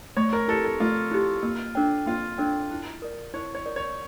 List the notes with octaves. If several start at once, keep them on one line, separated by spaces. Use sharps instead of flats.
A3 C#5
A#4
E4 G4 A4
A4
A3 F4
E4 G4
A#3
D4 A4 C#5 G5
A#3 F4
D4 A4 C#5 G5
E4
A#4 D5
E4 C#5
C#5
A#4 D5
C#5